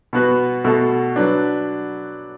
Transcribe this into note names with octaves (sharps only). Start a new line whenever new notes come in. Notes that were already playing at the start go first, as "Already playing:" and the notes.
B2 B3 F#4 B4
B2 A3 F#4 A4
F#3 D4 B4